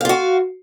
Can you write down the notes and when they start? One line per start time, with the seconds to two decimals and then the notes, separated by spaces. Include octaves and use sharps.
0.01 F5
0.05 F4
0.09 F#4